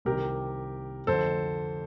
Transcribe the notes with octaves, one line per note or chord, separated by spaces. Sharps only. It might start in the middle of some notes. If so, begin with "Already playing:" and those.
C2 C3 D#3 G4 A#4
F2 D3 A4 C5